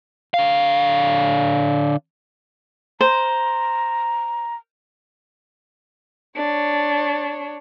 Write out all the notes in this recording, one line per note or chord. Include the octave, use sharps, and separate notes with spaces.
D3 F5
C5 A#5
D4 C#5